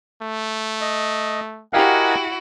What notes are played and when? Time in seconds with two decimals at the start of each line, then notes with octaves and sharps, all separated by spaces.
0.22 A3
0.81 D#5
1.73 E4 F#4 G4 A#4 D#5 F5 F#5 G#5